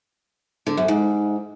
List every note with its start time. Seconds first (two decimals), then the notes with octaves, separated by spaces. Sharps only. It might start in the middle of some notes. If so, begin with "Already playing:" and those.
0.67 D3
0.77 F#2
0.88 G#2